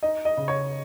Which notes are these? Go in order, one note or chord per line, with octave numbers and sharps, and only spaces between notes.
D#4 D#5
D#5
C#3
C#5